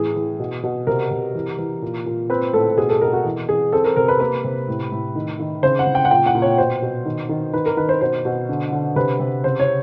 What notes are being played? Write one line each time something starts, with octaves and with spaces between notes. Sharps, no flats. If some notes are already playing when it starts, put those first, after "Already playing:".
Already playing: A2 E3 G#4
E3
B2
B2
C3 A#4
C3
E3
E3
A#2
A#2
C4 B4
A2 A4
B2 G#4
A4
B2 A#4
F#4
E3
E3 G#4
C4 A4
A#4
C3 A#4
B4
A#3 B4
C3
A2
A2
D#3
D#3
C#3 C5
F#5
C#3
G5
F#5
A#2 G5
F#5
A#2
C#5
B2 C5
B2
D#3
D#3
D#3 B4
A#4
D#3 B4
C5
B2 C5
B2
D3
D3
C3 B4
C3
C#3 C5
C#5